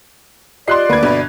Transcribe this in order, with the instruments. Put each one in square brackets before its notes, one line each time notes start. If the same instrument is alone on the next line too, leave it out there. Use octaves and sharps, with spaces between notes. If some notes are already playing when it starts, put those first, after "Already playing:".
[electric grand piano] F4 G4 D#5 [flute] D5 [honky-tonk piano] C6 F#6 C7
[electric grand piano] D2 A#3 [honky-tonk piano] B4 G#6
[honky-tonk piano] G1 B4 [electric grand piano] B2